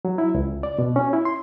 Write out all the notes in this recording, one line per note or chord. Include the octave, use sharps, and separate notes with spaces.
F#3
E4
C#2
D5
B2
C#4
E4
C6